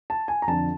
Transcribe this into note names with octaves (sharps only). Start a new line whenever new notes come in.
A5
G#5
A#5
F2 D3 F3 A5